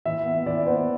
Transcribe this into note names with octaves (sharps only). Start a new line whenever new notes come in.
E3 E5
B3
E3 D5
B3 C5